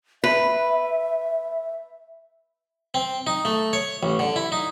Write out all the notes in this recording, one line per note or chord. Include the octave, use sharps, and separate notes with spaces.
B4 E5
C4
D#4
A3
C#5
A1
D3
E4
D#4